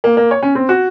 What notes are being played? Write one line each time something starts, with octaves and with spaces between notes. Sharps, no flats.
A#3
A#3
C#5
C#4
C4
F#4